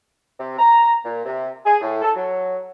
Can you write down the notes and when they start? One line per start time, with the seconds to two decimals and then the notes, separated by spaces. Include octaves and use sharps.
0.38 C3
0.58 A#5
1.04 A#2
1.25 C3
1.65 G#4
1.81 A2
2.02 A4
2.15 F#3